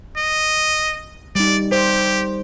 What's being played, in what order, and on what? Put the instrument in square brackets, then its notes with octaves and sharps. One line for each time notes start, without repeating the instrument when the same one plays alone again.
[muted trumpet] D#5
[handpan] G3 D#4 [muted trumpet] D5
[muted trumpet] G4 [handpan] C5